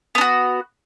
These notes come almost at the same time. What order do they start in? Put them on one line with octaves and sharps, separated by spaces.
B3 D4 F#4